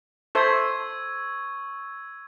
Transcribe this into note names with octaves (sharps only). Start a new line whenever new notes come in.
A4 C5 E5 C#6 E6 G#6